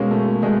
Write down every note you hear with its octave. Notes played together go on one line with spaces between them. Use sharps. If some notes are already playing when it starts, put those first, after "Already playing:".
Already playing: B2 G#3 A#3 C#4
A3
B2 G#3 A3